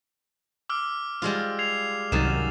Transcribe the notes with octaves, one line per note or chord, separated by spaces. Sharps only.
D6 E6 F6
G3 G#3 F4
G#6 C7 F7
C2 F#2 C3 D#3 A6 E7